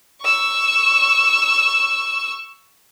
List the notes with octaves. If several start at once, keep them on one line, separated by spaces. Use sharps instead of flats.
C#6 E6